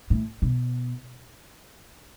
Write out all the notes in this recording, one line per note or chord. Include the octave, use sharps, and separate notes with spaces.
A2
B2